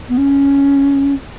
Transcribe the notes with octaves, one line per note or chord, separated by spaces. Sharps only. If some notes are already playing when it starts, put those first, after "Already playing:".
B3
C#4